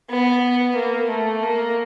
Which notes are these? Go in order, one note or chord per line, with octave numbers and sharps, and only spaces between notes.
B3
A#3
A3
A#3